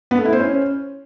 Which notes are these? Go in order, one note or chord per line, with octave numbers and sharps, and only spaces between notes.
B3
A3
E4
C5
C#4